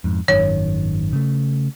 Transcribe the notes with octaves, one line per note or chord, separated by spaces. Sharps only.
F2 G#2
G#1 F#2 D#3 C#5
C#3 A3